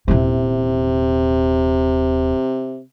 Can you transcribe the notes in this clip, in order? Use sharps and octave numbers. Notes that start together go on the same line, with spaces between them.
D#1 C3 E3